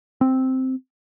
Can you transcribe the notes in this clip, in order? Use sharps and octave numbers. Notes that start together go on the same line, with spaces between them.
C4